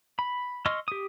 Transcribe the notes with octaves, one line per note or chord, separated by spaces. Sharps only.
B5
D#5 C6 C#6 E6 F6
G4 D#6